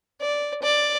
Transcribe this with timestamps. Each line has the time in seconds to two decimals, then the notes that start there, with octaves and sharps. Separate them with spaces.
0.21 D5
0.62 D5